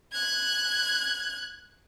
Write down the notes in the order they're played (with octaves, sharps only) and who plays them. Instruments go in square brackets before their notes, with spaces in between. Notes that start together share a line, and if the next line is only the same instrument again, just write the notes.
[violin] F#6 G#6